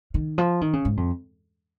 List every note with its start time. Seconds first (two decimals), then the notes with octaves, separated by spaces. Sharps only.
0.14 D#3
0.38 F3
0.61 D#3
0.73 C#3
0.85 G#2
0.97 F2